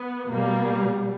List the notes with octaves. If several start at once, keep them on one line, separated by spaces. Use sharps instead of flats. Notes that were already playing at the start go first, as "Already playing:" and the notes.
Already playing: B3
B2 G3 A#3